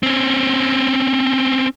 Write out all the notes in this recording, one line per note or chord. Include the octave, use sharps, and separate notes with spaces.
C4 C#4